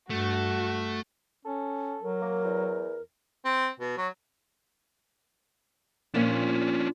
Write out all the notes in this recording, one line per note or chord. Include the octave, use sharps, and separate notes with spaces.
G2 A3 F#4
C#4 A4
F#3 A#4
A#3
E2
C4
B2
F#3
A#2 F3 A#3 C#4 D4